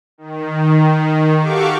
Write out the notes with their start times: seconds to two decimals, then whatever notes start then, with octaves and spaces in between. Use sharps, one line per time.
0.18 D#3
1.39 F#4 G4 A4 F5 C#6 D6